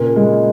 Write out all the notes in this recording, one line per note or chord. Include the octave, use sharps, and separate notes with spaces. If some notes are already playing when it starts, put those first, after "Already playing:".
Already playing: A#2 C#3 A#3
G#3